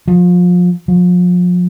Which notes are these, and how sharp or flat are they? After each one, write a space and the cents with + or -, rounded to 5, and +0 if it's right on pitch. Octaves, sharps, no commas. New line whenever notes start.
F3 +30
F3 +35